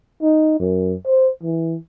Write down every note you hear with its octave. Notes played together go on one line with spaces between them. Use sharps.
D#4
F#2
C5
E3